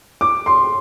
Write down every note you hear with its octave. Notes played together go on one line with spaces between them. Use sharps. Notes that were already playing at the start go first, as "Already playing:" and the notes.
D6
C6